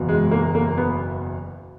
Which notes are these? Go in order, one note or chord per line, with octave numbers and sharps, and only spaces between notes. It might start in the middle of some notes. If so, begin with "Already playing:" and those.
Already playing: F#1 E2 B2
G#3
A#3
A#3
B3